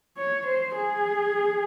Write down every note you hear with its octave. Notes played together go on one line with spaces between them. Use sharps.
C#5
C5
G#4